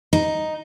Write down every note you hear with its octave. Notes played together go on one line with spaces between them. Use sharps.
D#4